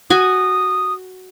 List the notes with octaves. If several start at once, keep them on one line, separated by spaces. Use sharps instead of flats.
F#4 G#5 D#6